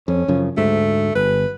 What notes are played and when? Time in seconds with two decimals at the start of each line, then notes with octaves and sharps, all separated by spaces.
0.08 F2 C#4
0.28 F#2 C#3 F3
0.57 D2 G#2 A3
1.15 G1 B4